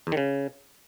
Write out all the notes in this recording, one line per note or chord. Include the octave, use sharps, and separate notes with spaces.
E2
D#3
C#3